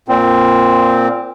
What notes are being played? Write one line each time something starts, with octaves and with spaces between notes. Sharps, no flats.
A#2 C4